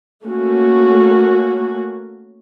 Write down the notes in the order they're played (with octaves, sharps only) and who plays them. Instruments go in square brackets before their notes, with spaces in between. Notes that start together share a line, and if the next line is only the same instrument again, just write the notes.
[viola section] A3 A#3 C#4 F#4